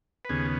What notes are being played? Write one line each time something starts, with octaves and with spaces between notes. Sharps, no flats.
B4
D#2 C#3 B3 G#4